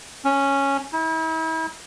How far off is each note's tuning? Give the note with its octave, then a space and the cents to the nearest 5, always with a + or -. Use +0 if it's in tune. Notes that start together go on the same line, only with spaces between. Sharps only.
C#4 -5
E4 -40